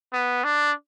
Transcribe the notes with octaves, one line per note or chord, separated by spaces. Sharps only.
B3
D4